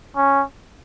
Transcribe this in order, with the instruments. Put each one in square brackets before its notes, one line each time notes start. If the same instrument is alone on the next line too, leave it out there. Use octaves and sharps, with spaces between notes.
[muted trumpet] C#4